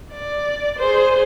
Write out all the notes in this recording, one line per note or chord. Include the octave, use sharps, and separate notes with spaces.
D5
G#4 C5